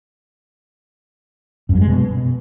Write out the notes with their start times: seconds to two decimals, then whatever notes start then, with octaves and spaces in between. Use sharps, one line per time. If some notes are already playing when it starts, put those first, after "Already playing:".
1.69 F#2
1.75 F#3
1.81 G#3
1.87 B2